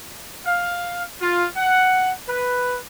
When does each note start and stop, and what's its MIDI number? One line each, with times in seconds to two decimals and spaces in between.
0.46 1.03 77
1.20 1.45 65
1.57 2.11 78
2.27 2.76 71